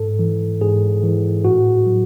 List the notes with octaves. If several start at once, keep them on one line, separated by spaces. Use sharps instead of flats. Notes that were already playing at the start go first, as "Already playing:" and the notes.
Already playing: G#2 A4
E3
G#2 G#4
E3
A2 F#4
F#3